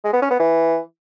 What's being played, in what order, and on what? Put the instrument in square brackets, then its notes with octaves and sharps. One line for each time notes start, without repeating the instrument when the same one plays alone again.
[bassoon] G#3
B3
C#4
B3
E3